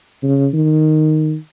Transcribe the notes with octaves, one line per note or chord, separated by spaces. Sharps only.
C#3
D#3